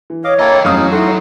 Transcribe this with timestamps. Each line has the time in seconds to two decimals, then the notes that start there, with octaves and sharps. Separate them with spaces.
0.10 E3
0.24 C#5 D#5 F5 D6
0.39 A#3 E4 A4 D#5 G5 A#5
0.65 F1 G2 F#3 C#4 D#4 F5 D#6
0.76 E2
0.92 D#4 E4 F#4 A4 C6